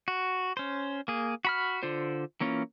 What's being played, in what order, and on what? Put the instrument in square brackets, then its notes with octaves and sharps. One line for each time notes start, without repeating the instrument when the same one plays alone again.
[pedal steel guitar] F#4
C#4 C5
A#3 G#4
F#4 B5 F6
D3 F4 C5
E3 A#3 C#4 F4